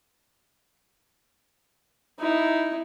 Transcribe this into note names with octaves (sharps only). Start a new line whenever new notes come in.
D#4 E4